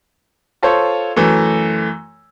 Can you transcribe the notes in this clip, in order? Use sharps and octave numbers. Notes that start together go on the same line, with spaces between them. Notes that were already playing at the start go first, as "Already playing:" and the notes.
F4 A4 C5 C#5
F#2 E3 A3